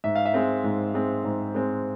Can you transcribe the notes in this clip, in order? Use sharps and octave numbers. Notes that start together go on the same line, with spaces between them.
G#2 E5
F5
E5
G#3 C4
G#2
G#3 C4
G#2
G#3 C4